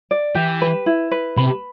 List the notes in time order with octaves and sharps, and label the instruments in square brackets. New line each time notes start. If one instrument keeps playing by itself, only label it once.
[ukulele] D5
[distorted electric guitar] E3 [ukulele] G4
[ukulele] B4
E4
B4
[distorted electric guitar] C3 [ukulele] B5